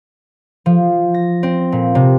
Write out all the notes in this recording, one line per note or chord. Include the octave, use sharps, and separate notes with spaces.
F3
A#6
C4
A#2
C3